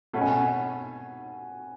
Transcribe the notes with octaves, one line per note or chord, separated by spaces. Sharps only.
B2 A3 C#4 F#5
G#5
F#5